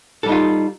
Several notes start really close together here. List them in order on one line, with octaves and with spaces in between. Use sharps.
A4 G3 D#4 F4